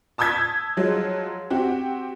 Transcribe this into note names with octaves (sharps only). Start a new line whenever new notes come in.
A5 D#6 E6 G6 G#6 B6
F3 F#3 G#3
C4 F#4 G4